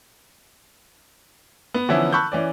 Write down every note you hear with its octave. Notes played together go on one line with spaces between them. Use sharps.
B3
D3 E3 F3 B3 C#4 E4
A5 B5 C#6 E6 F#6 G6
E3 C#4 D5